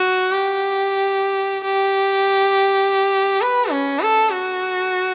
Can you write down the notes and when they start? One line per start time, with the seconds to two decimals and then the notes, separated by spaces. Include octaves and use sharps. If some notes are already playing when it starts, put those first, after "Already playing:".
Already playing: F#4
0.32 G4
1.64 G4
3.41 B4
3.71 C#4
4.01 A4
4.30 F#4